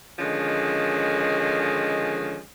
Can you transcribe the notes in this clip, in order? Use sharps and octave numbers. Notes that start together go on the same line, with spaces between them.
D3 D#3 F3 G#3 C#4